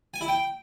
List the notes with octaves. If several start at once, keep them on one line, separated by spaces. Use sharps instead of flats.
G#5
E4
G5